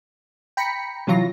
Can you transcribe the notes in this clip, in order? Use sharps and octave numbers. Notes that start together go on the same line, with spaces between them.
G5 A#5 B5 B6 C#7
C3 E3 F#3 F4 A#6